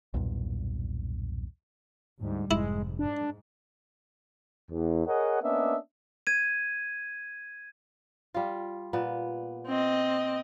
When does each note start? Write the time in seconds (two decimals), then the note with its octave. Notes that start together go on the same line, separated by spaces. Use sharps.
0.14 B1 E2 G2 A#2
2.21 D2 G#2 G3
2.51 F1 G#2 G#3 E4
2.99 G#2 D4
4.70 E2
5.06 G#4 A#4 C#5 D#5 F#5
5.42 A#3 B3 C#4 D4 D#5 E5
6.27 G#6 D#7
8.34 G3 F4
8.93 A#2 B3
9.67 C4 D#5